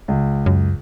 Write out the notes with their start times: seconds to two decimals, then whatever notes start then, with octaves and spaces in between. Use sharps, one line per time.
0.08 C#2
0.46 F#2